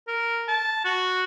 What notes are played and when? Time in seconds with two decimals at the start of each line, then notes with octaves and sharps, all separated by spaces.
0.08 A#4
0.48 A5
0.85 F#4